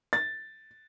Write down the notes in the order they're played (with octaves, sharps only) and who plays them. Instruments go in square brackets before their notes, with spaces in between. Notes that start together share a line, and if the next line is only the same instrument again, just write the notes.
[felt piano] A6